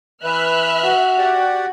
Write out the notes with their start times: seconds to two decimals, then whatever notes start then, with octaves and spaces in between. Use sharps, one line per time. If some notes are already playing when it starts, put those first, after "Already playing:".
0.24 E3 B4 E5 F6 F#6
0.84 F#4
1.18 G4 D5 F#5